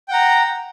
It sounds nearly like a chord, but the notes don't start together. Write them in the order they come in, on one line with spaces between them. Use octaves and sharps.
G5 F#5 A#5